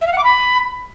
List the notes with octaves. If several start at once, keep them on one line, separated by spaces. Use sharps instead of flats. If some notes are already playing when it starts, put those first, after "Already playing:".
E5
F5
F#5
D6
B5